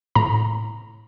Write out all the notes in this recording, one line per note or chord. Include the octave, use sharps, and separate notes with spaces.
A2 A#5